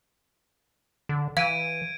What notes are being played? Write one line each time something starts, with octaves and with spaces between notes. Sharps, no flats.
D3
E3 F5 G#6 D7 D#7